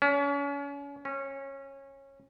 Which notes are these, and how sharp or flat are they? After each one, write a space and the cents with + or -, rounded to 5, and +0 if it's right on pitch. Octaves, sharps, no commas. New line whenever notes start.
C#4 +35
C#4 -20